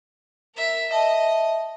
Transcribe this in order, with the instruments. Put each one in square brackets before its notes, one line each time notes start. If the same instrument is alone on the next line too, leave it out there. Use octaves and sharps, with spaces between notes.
[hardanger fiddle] A#4 E5
[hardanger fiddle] D#5 [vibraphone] E5 A5